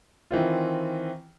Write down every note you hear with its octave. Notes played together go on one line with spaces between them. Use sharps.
D#3 E3 C4 F4